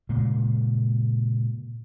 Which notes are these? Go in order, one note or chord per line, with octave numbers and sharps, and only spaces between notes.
A#2 C#3 G#3